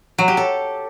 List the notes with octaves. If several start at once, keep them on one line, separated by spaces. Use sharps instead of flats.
F#3
G4
A4